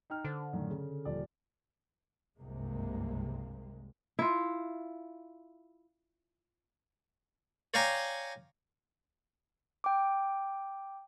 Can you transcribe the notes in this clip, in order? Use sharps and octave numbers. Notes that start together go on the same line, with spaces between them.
D#4 G5 F6
D3 C5
F#2 A2 D#3
C#3
D#1 F3 D5
F#1 C2 G2 C3 G#3 A#3
E4 F4
C#5 D5 F5 G5 G#5 A#5
G5 D6